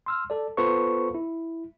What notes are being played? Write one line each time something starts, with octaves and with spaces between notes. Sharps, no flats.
C6 E6 F6
A4 D5
B3 F4 A4 B4 C5 C#6
E4